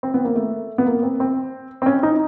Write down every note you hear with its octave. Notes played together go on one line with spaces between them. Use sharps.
C4
B3
A#3
A3
B3
A#3
C4
C4
C4
C#4
D#4